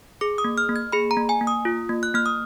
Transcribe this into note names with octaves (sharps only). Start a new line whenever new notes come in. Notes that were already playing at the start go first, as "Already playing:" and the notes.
G#4 D6
D#6
A#3
F6
A#3
G#6
G#4 B5
A#5
A#3
G#5
A#3
D#6
F4
A#3
F#6
A#3 F6
D#6